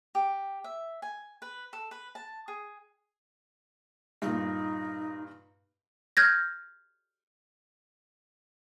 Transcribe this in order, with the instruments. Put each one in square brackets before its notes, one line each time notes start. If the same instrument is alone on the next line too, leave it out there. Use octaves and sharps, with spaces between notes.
[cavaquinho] G4
E5
G#5
B4
A4
B4
A5
G#4
[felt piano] G2 A#2 [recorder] D#4
[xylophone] F6 G6 G#6 A#6